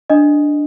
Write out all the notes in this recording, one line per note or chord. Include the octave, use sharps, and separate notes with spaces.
D4 D#5